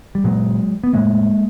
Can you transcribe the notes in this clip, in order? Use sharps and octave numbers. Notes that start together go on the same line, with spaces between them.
G3
A#2 F#3 G#3
B3
A2 G#3 A#3